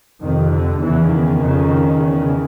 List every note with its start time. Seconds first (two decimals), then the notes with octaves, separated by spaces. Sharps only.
0.21 F2 C3 D#3
0.51 D3
0.80 E2 C#3 E3
1.10 D#3
1.39 F2 C#3
1.98 E2 C#3